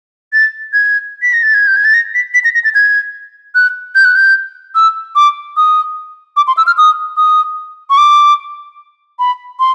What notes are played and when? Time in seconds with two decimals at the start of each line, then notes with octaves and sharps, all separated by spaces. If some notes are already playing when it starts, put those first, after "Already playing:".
0.33 A6
0.73 G#6
1.22 B6
1.33 A#6
1.43 A6
1.54 G#6
1.67 G6
1.76 G#6
1.85 A6
1.94 A#6
2.15 B6
2.34 B6
2.44 A#6
2.54 A#6
2.64 A6
2.75 G#6
3.55 F#6
3.95 G6
4.05 F#6
4.16 G6
4.75 E6
5.15 D6
5.57 D#6
6.37 D6
6.47 C6
6.57 E6
6.67 F6
6.78 D#6
7.17 D#6
7.90 C#6
7.98 D6
9.19 B5
9.60 C6